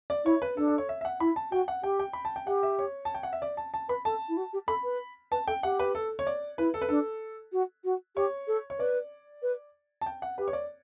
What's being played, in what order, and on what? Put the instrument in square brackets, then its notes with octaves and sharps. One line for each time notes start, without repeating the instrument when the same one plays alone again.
[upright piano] D5
[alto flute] E4 [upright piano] C#5
[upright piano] B4
[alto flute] D4 [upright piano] A4
[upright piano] A4
C#5
E5
E5
F#5
[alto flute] E4 [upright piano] B5
[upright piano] A5
[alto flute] F#4 [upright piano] G5
[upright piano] F#5
[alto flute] G4 [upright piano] G5
[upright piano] G5
B5
A5
G5
[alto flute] G4 [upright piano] F#5
[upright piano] E5
C#5
A5
G5
F#5
E5
D5
A5
A5
[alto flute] B4 [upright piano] B5
[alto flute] A4 [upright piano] A5
[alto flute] E4
F#4
G4
[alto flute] A4 [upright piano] B5
[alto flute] B4
[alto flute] B4 [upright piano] A5
[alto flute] A4 [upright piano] G5
[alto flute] G4 [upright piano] F#5
[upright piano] B4
A4
C#5
D5
[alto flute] E4 [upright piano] B4
[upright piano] A4
B4
[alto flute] D4 [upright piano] A4
[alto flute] F#4
F#4
[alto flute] G4 [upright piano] C#5
[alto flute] A4
[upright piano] C#5
[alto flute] B4 [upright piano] D5
[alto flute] B4
[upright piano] A5
G5
F#5
[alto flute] G4 [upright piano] B4
[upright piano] C#5
D5